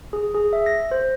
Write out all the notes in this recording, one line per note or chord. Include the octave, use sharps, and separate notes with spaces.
G#4
G#4
E5
A#6
C5